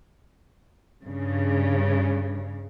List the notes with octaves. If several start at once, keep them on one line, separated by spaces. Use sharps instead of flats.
G2 C#3